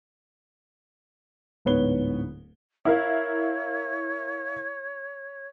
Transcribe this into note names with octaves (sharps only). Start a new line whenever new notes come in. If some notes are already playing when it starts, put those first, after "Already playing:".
D1 G#2 B3 B4 C#5 G7
E4 A#4 C#5 F5